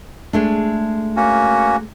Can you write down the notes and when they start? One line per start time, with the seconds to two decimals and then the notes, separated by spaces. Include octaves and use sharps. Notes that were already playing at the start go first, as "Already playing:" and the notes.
0.33 G#3 A3 D4
1.16 A#3 C#4 F#4